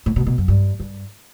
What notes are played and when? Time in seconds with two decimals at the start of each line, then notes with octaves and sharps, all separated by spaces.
0.06 A2
0.16 B2
0.26 B2
0.38 F#2
0.48 G2
0.80 G2